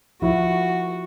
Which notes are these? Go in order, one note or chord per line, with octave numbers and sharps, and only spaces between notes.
F3 E4 F#4